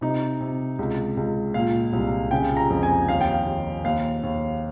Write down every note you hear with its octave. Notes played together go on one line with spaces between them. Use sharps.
C3 D#4
C3
C#2
C#2
A#2 F5
C2
C#3 G5
A#5
F2
G#5
D#2 F5
G5
F5
D#2
D#2 F5
D#2